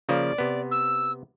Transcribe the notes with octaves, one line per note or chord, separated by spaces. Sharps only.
C#3 F3 A#3 D5
C3 B3
E6